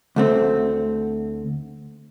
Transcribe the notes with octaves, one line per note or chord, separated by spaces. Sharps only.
D2 A3 C4